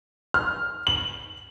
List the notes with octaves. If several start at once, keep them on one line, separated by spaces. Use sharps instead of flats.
F6
F#7